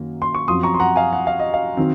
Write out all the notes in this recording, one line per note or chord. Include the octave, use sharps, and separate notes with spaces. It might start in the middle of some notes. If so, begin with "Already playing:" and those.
Already playing: F#2 D#3 A#3
C6
C#6
F#2 F3 C4 C6 D#6
A#5 C#6
C6
F#5 A#5
F5 G#5
F#5
F5
D#5
F5
D#3 F#3 C4